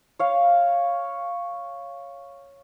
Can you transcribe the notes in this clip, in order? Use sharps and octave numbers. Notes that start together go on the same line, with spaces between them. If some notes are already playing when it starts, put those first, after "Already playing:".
C#5 F5